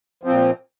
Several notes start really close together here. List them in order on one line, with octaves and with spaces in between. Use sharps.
F3 C4 A#2